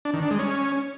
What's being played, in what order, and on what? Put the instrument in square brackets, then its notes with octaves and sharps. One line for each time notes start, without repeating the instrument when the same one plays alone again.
[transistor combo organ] D4
D#3
D4
G#3
C#4